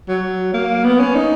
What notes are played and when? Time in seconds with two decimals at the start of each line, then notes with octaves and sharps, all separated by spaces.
0.08 F#3
0.53 A#3
0.84 B3
0.99 C#4
1.15 D#4